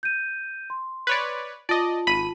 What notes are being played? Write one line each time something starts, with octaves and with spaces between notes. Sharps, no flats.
G6 D#7
C6
B4 C#5 D5
F4 D5 D#5 A5
G#1 B5 D#7